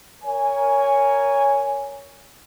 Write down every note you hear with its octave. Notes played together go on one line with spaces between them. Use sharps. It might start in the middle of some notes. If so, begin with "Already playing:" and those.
A#4 C#5 G#5